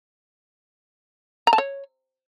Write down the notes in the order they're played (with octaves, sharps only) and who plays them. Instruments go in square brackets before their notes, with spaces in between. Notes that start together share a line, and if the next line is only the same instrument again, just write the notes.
[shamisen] A#5
A5
C#5